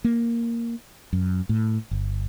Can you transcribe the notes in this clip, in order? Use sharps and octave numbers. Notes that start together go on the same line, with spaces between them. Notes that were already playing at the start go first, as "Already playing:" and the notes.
A#3
F#2
A2
G1